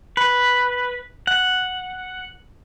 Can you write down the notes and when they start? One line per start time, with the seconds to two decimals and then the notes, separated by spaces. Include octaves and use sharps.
0.17 B4
1.27 F#5